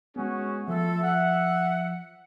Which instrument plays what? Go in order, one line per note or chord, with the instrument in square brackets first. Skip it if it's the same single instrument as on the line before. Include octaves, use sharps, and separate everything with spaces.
[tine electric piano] G#3 B3 [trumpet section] C#4 F#4 G#4
[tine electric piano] F3 [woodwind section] A3 F4 A4 [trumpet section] E5
[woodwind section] F#5